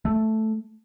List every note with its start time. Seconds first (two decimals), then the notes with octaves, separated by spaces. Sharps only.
0.05 A3